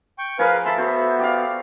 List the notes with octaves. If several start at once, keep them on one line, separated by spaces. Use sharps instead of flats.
G5 C#6
F3 G#4 A#4 B4 F5
A4 E5 A5 B5 C6
B3 F#4 A4 C5
G4 D5 F5